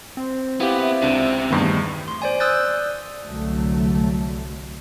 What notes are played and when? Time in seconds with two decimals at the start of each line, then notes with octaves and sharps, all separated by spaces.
0.17 C4
0.60 B3 E4 G4 F5
0.81 E5
1.02 C#2 C3 D4
1.51 E2 G2 D#3 A3 B3
2.08 C6
2.22 C5 D5 G#5
2.40 D5 D#6 E6 F#6 G6 A6
3.25 C2 D3 F#3 A3